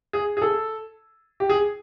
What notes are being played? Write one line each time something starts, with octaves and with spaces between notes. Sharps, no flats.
G#4
G#4
A4
G4
G#4